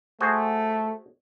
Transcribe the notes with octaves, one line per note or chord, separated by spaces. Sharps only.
A3 F#4 G#4 C5